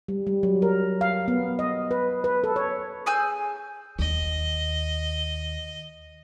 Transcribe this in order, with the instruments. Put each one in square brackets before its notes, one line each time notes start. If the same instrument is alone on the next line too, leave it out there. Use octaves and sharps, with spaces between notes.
[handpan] G3
G3
F#3
A#4
F5
B3
D#5
B4
B4
A4
C#5
[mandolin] G#4 G#5 E6 G6
[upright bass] D#2 [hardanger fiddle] D#5